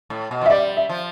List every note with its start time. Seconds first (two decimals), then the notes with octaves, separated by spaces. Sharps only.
0.10 A2
0.31 B2
0.42 F3
0.46 E5
0.50 G3 D5
0.77 E5
0.89 F3